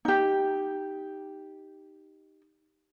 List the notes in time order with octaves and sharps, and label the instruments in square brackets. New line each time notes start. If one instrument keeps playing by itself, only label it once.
[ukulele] D#4 G4